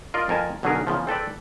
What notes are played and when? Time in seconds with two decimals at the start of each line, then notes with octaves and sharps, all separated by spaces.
0.14 F4 A#4 D5 D#5
0.29 F2 A#4 G#5 A5
0.63 B1 D3 F#3 C#4 G#4 A#4
0.87 E2 C#3 F3
1.07 C4 A4 B4 D5